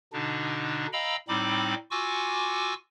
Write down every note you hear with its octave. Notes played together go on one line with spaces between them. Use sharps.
B2 D3 D4 D#4
D#5 F5 G5 A#5 B5 E6
A2 G3 C4 D#4 B5 D6
F4 F#4 G#5 C#6 D6 E6